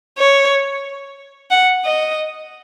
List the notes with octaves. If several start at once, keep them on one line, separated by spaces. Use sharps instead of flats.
C#5
F#5
D#5